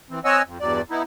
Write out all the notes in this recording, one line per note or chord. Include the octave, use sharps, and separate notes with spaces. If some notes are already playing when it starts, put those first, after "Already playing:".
E3 C4
C4 C#5 D#5 F#5 G#5 E6
F2
E2 G2 F#3 D5
B3 D#4 E4